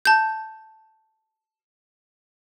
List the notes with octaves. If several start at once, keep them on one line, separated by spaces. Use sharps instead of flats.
A5 G6